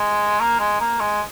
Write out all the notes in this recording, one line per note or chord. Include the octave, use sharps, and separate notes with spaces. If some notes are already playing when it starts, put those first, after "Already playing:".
Already playing: G#3
A#3
G#3
A#3
G#3